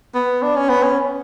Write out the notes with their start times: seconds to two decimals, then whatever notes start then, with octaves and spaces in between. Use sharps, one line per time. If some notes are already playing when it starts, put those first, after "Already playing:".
0.15 B3
0.42 D4
0.56 C#4
0.69 B3
0.83 C#4